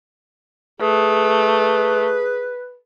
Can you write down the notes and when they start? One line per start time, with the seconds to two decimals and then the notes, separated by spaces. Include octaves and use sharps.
0.81 A3 G#4 B4